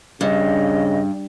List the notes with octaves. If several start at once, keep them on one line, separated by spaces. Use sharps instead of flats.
G2 C#3 D#5